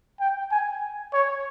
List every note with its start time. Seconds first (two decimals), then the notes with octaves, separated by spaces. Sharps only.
0.20 G5
0.51 G#5
1.13 C#5